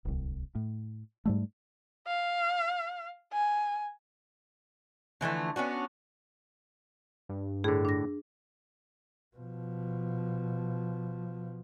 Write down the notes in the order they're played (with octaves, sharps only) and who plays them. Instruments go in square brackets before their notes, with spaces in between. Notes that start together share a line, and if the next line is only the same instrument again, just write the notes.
[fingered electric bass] D1 C2
A2
G#2 G3 A3
[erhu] F5
G#5
[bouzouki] D3 E3 F3 A3
B3 C#4 D4 F#4
[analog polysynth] G2
[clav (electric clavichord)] A2 D3 [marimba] G#4
[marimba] D4 A#6
[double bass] B2 F3